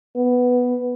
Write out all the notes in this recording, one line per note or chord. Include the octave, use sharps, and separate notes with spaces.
B3